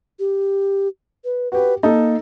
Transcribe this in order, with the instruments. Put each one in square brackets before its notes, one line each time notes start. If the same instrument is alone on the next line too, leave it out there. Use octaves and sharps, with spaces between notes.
[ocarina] G4
B4
[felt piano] F#4 G4 [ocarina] B4
[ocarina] A#3 [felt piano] D#4 A4